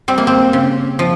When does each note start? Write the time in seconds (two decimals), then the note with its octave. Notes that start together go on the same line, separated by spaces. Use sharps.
0.08 G3 C4
0.18 A#3
0.27 C4
0.53 C#3
0.99 F3